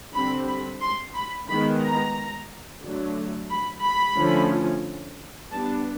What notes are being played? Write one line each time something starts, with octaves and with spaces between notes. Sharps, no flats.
D3 G3 C4 B5
B5
C6
B5
D#3 G#3 B3 B5
A#5
D3 F#3 A3
B5
B5
D3 F3 A3 C#4
G3 B3 D4 A5